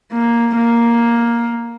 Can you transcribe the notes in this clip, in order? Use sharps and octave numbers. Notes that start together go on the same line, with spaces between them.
A#3
A#3